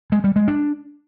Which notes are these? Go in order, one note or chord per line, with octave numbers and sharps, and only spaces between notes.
G#3
G3
G#3
D4